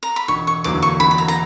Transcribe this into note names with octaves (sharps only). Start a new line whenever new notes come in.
A#5
B5
E1 C#6
C#6
E2 D3 F#3 A#3 D6
C#6
E1 B5
B5
A#5
A#5